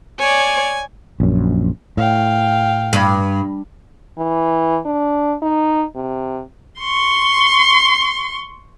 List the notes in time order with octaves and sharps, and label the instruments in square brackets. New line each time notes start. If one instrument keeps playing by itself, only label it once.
[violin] C#5 D5 [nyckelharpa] G#5
[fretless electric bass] A#1 F#2
[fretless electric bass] A2 [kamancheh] F5 G5
[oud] G2
[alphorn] E3
D4
D#4
C3
[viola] C6 C#6